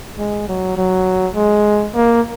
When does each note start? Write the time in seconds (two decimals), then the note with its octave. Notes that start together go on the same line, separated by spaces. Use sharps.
0.18 G#3
0.48 F#3
0.77 F#3
1.35 G#3
1.95 A#3